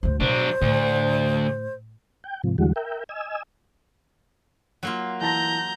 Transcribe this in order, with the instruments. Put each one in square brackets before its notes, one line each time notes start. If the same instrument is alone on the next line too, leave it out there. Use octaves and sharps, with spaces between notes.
[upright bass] D2 G2 [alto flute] C5
[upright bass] B2 [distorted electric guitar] F#3 D4 [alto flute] C5
[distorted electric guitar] D2 [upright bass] A2
[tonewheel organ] G5
G#2 C3 F3
E2 D3 E3 G3 G#3 F#4
A#4 E5 G5
D#5 G#5 E6
[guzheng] F#3 A#3 F4
[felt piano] E3 A5 A#6 [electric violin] A#5 G6